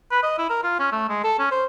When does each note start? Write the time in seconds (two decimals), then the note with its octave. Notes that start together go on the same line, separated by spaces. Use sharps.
0.11 B4
0.23 D#5
0.38 E4
0.50 A#4
0.63 F4
0.79 C#4
0.92 A3
1.09 G#3
1.24 A4
1.39 C#4
1.51 C5